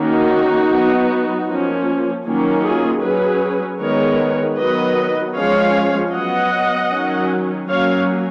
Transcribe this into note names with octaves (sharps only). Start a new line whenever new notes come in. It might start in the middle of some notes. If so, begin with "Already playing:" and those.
Already playing: D#3 A#3 C#4 D#4 F#4
F#3 B3
F3 A#3 C#4
D#3 F#3 A#3 C#4
F4 G#4
F#3 C#4 G#4 B4
D#3 G#3 B3 A#4 C#5
D#3 F#3 B3 B4 D#5
F3 G#3 C#4 C#5 F5
F#3 B3 D#5 F#5
D#3 F#3 C#4
F#3 A#3 C#4 C#5 F5